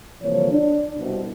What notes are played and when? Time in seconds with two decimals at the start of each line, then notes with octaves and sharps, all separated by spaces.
0.23 C2 D3 E3 F3 A#3 C#5
0.52 D4
1.00 C2 B2